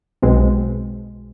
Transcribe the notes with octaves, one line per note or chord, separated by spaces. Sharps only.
B1 B2 G#3 C4